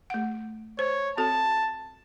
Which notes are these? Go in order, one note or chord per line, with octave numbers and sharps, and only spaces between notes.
A3 F#5
C5 C#5
C4 F#4 A4 A5